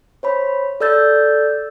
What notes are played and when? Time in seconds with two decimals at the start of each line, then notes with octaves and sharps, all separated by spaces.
0.23 C5 C#5 B5
0.80 A4 D5 E6 G6 A6